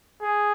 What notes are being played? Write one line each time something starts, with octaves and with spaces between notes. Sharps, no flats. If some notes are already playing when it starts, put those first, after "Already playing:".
G#4